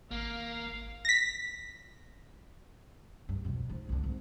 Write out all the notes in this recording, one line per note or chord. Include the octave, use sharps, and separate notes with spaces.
G#1 A#3 F5
A#6 B6
G2
F2 B2
G#2 F3
B1 D3
G#1